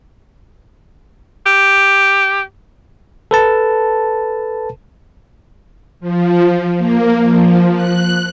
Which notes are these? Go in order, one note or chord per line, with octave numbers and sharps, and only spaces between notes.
G4
A4 B4 A5
F3
A#3
F3
F#6